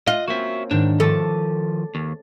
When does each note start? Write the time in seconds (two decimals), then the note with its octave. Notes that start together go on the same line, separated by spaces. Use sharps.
0.07 F4 D#5 F#6
0.28 A#3 C4 C#4 F#4 E5
0.71 G#2 D#3 D4
1.00 D#3 F3 A4 A5 D6
1.95 D#2